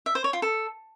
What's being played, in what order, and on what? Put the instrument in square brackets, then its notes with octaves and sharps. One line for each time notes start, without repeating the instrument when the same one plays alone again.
[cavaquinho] E5
C5
C#5
F4
A4